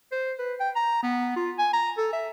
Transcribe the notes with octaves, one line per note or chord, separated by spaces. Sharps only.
C5
B4
G5
A#5
B3
F4
G#5
A#5
A4
E5